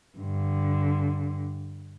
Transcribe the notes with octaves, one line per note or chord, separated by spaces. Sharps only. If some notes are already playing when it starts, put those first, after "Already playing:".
G2 D3